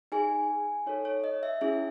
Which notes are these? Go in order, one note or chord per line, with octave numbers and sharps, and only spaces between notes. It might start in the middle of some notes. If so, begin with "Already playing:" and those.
D#4 G#4 G#5
D#4 A4 C#5
C#5
D#5
E5
C#4 E4 G#4 E5